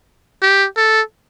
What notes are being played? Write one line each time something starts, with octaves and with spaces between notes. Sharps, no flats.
G4
A4